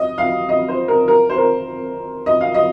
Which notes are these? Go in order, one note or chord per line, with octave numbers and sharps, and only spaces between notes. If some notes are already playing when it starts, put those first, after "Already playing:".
Already playing: D#5
F5
D#5
C5
A#4
A#4
C5
A#4
D#5
F5
D#5